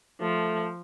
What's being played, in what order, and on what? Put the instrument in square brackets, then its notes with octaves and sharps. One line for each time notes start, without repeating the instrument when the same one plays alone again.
[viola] F3 [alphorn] A3